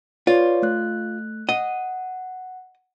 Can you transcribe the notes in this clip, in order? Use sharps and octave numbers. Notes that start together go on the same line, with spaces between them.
F4 B4 C#5 D5
A3 F#6
D#5 F#5